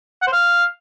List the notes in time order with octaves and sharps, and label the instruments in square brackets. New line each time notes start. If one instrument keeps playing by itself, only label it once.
[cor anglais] F#5
C5
F5